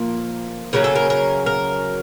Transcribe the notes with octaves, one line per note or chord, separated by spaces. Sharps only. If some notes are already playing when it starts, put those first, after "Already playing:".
Already playing: A#2 F3 A#3
C#3 F#3 A#3 C#4 A#4
A4
A#4
A#4
A#4